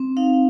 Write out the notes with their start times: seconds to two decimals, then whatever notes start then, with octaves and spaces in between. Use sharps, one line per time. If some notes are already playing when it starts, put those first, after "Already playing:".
Already playing: C4
0.17 D#4 F5